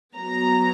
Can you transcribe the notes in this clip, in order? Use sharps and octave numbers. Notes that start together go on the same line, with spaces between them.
F#3 B3 A#5